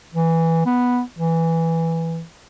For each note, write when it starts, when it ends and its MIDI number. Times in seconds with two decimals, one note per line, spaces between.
0.14 0.65 52
0.66 1.00 59
1.18 2.21 52